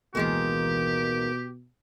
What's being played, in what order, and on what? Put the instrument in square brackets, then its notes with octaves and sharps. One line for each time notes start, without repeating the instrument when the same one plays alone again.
[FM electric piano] A1 D2 E3 [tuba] B2 [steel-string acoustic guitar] D#3 G#3 A#3 [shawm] G4